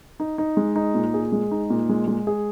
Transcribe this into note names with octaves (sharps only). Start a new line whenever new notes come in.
D#4
D#4
G#3
D#4
A#2
G#4
G#3
D#4
A#2
G#3
G#3
G#4